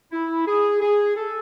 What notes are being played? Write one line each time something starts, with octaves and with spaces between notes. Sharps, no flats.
E4
G#4
G#4
A4